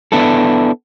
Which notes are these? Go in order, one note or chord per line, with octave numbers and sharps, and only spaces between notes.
B3 D4 E4 A4